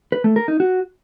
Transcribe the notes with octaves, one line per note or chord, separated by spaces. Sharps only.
B4
A3
A#4
D#4
F#4